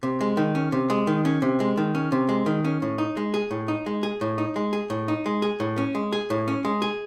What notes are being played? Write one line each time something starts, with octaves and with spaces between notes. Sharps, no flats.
C3
G#3
D#3
C#4
C3
G#3
D#3
C#4
C3
G#3
D#3
C#4
C3
G#3
D#3
C#4
A2
D#4
G#3
G#4
A2
D#4
G#3
G#4
A2
D#4
G#3
G#4
A2
D#4
G#3
G#4
A2
C#4
G#3
G#4
A2
C#4
G#3
G#4